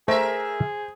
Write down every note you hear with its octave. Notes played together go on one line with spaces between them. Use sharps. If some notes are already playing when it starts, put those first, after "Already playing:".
A3 G#4 A#4 C5 E5